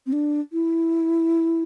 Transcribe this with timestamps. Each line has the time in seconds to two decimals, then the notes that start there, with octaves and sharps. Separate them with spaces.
0.06 C4
0.13 D4
0.53 E4